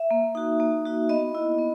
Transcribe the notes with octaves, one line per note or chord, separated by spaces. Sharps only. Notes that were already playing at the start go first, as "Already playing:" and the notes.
Already playing: E5
A#3
D#4 F#4
A#3
D#4 F#4
B3 D#5
E4
B3